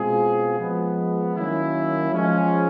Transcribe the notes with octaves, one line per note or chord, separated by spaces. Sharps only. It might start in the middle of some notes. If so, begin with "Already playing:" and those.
Already playing: B2 G#3 C4 F4 G#4
F3 G#3 B3
D#3 F#3 A#3 C#4 E4
F3 G#3 C#4